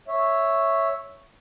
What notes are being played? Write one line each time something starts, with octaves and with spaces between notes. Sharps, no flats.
C#5 E5